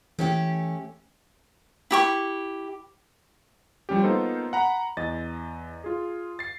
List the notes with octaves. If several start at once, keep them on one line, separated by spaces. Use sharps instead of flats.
E3 A3 C#4 G4
E4 G4 C#6
F3 G3 C#4 G4
A#3 B3 D#4 F4 A4 C5
F#5 A#5 B5
E2 D#5 A6
F4 G#4
A6 C7